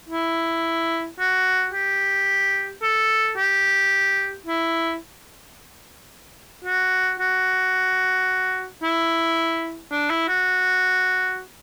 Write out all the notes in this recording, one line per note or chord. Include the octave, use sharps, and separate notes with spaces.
E4
F#4
G4
A4
G4
E4
F#4
F#4
E4
D4
E4
F#4